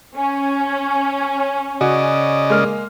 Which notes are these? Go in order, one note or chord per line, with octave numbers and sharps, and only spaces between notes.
C#4
C#3 F#4 D5 D#5
G#3 A#3 F6